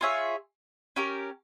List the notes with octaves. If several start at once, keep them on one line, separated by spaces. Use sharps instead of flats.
F4 G#4 C#5 E5
C#4 G4 A#4